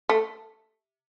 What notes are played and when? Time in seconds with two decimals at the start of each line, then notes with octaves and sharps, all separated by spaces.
0.09 A3